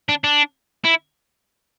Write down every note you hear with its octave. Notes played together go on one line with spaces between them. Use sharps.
D4
D4
E4